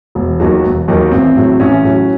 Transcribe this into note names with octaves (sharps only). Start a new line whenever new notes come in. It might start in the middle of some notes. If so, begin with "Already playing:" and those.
E1
D#2 D#3 F#3
E1
D#2 D#3 F#3
A1 C4
A2 F#3
A1 C#4
A2 F#3